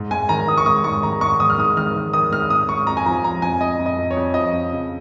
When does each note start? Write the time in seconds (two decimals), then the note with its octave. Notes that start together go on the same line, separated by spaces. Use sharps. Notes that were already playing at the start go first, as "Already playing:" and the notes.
Already playing: G#2
0.11 G#2 G#5
0.29 D#3 A#5
0.48 D#3 D#6
0.58 C#6
0.66 G#2 D#6
0.84 G#2 C#6
1.03 D#3 A#5
1.21 G#2 C#6
1.40 D#3 D#6
1.50 F6
1.58 G#2 D#6
1.77 D#3 F6
1.96 D#3
2.13 D#3 D#6
2.31 G#2 F6
2.50 G#2 D#6
2.69 G#2 C#6
2.87 F2 A#5
2.97 G#5
3.06 F3 A#5
3.23 F3 A#5
3.42 F2 G#5
3.60 F2 D#5
3.79 F2
3.86 D#5
3.98 F2
4.11 C#5
4.17 F2
4.34 F3 D#5
4.53 F2
4.72 C#3